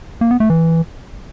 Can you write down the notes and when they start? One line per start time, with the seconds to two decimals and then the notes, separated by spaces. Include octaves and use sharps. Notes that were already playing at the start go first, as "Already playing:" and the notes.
0.21 A#3
0.31 B3
0.40 A3
0.50 E3